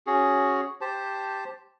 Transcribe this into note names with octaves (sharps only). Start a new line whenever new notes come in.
C#4 F#4 G#4
G4 C5 A5